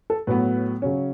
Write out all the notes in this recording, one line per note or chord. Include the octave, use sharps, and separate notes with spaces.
A4
A2 F#3 B3 B4
C#3 F#3 C#4